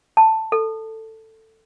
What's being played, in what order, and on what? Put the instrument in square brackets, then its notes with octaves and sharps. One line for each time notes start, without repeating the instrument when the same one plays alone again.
[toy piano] A5
A4